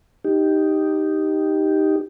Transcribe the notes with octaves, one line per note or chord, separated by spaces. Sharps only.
D#4 G4